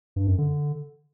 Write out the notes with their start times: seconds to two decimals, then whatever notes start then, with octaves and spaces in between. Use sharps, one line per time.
0.16 G2
0.27 F#2
0.38 D3